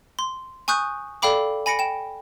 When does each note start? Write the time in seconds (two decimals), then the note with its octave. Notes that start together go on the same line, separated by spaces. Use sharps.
0.19 C6
0.68 G#5 C#6 D#6 F#6 G6
1.22 A4 D5 F5 G5 B5 D6
1.66 G#5 B5 A#6 C#7 D7
1.79 G5 E7